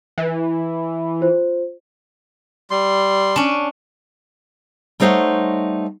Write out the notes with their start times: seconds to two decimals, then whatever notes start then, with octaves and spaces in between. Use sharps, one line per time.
0.18 E3
1.21 F4 C5
2.71 G3 C6
3.36 C#4 D4
5.00 G3 A3 D#4 C5 C#5 F#5